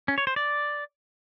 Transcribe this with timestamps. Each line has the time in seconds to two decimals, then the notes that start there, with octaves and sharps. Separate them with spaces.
0.08 C#4
0.18 C#5
0.27 C5
0.36 D5